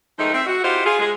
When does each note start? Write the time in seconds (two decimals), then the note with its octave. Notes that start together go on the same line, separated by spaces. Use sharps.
0.19 D#3 F3 G#3 A3 D#4
0.33 C4 E5
0.47 F#4
0.64 E4 F4 G4 C5 D#5 F#5
0.85 F4 G#4
1.00 G#3 G#4